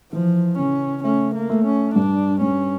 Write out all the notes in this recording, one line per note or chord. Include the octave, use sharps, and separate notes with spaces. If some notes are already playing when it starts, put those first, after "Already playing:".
E3 F3
C#3 C#4
A3 C#4
A#3
A3
C#4
G2 D4
G2 C#4